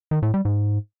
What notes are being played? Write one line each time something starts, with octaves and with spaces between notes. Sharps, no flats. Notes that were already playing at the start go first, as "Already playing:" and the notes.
D#3
A2
G3
G#2